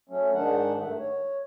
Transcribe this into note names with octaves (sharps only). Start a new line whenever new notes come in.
F#3 A3 C#4
G#2 D#3 D4 F#5
G2 D#3 A3
C#5